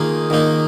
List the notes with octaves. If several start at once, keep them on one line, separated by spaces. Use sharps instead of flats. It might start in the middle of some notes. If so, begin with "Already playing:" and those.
Already playing: D#3 A#3 D#4 F4 G#4
D#3 A#3 D#4